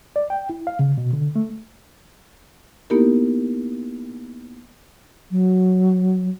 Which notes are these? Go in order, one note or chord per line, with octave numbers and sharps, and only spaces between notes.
D5
G5
E4
F5
C#3
B2
D3
A3
A#3 B3 D#4 E4 G4 A#4
F#3